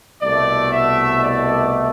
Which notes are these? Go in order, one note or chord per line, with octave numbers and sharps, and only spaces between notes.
C2 B2 A3 D5
E5
D5